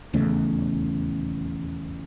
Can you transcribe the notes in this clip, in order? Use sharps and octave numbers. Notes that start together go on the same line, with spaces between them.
D#1 E2 C#3 A3